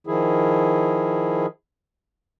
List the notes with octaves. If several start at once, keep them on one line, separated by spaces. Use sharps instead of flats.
D#3 F3 E4 G#4